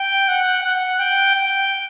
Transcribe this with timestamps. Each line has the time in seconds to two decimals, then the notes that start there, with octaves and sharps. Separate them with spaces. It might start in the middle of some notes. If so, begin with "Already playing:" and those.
Already playing: G5
0.28 F#5
0.63 F#5
0.99 G5
1.35 G5